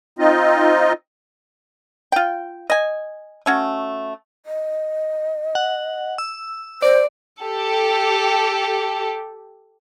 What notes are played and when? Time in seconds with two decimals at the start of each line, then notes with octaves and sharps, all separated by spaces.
0.19 C4 D#4 F4 D#5
2.12 F4 G5
2.70 D#5 G#5
3.46 A3 C#4 F#4
4.46 D#5
5.55 F#5
6.18 E6
6.82 C5 D5
7.43 G4 A4